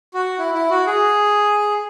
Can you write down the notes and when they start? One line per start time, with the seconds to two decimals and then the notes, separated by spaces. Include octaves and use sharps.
0.14 F#4
0.38 E4
0.54 E4
0.70 F#4
0.87 G#4